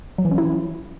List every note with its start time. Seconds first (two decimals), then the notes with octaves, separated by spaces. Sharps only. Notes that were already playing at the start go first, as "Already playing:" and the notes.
0.18 F#3
0.25 E3
0.31 C#4
0.38 E4